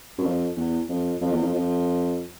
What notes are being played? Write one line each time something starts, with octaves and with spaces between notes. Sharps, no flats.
F#2
F2
E2
F2
F2
E2
F2
F2